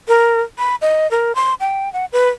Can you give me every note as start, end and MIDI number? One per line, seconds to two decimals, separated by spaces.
0.08 0.41 70
0.58 0.76 83
0.81 1.10 75
1.11 1.35 70
1.35 1.54 84
1.60 1.91 79
1.93 2.05 78
2.13 2.29 71